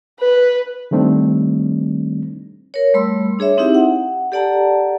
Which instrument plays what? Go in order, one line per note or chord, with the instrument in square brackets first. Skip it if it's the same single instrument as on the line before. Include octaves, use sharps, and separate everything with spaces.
[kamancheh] B4
[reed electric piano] D#3 G3 A3 C4 D4 D#4
[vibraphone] A#4 C#5
G3 A3 B5 C6 E6
D4 G#4 C#5 E5
C4 D#4 E4 G4 E5
F#5
G4 A4 D5 F#5 A5 A#5